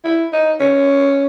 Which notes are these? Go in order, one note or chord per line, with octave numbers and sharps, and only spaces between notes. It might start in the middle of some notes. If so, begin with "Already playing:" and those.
E4
D#4
C#4